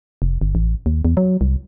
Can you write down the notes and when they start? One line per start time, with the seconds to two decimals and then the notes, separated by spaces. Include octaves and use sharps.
0.22 F1
0.41 G1
0.55 A1
0.86 D#2
1.05 E2
1.17 F#3
1.41 C2